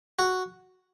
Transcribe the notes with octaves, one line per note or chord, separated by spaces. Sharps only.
F#4